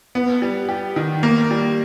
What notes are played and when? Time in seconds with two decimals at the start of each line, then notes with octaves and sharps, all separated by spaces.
0.15 B3
0.42 G3
0.69 G4
0.96 D#3
1.23 A#3
1.51 G3